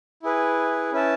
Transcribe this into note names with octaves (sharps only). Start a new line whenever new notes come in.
E4 G#4 B4
C#4 E4 B4 E5 A5